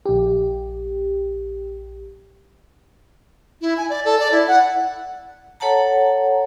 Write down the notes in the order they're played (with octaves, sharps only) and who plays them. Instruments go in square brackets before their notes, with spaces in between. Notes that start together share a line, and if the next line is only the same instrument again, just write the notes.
[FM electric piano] A#1 G4
[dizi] E4
G#5
D5
A4
D5
E4
F#5
[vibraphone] A4 C#5 F#5 A5 A#5